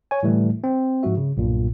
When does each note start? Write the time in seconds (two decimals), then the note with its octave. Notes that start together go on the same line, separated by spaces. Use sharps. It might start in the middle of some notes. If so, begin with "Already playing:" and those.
0.11 C#5 G#5
0.23 A2 D3 E3 G3 A3
0.64 C4
1.03 G#2 F3 G#3 F#4 E5
1.17 C#3
1.37 B1 G2 A#2